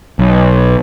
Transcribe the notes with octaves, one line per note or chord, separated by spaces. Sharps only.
B1